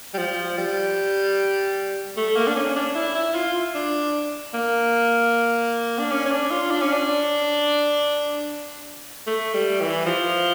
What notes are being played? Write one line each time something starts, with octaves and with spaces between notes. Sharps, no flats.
G3
F3
G3
A3
A#3
D4
C#4
C#4
D4
E4
E4
F4
D4
A#3
D4
C#4
C#4
D4
F4
D4
C#4
D4
A3
G3
E3
F3